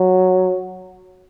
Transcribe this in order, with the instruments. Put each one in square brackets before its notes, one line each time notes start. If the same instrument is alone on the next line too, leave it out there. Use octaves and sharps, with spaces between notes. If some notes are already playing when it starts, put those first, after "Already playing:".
Already playing: [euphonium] F#3